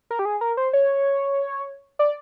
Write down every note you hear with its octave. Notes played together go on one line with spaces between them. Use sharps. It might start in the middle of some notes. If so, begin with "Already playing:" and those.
A#4
G4
G#4
A#4
C5
C#5
D5